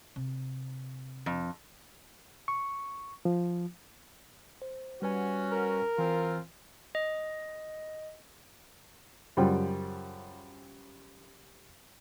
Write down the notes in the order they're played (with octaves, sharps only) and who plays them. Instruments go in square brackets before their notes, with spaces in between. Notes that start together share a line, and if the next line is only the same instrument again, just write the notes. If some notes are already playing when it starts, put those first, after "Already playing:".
[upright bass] C3
[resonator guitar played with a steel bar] F2
[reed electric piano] C#6
F3
[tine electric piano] C5
[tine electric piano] G3 B4 G#5 [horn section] C#4 F#4
[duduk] A#4
[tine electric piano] E3 G#5 [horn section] C4 F4
[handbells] D#5
[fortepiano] F#2 C#3 G3 F4 C5 G5